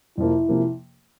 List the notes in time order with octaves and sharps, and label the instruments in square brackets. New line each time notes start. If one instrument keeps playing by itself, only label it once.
[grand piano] F2 C3 F3 A#3 [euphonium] E4
[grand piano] C3 F3 A#3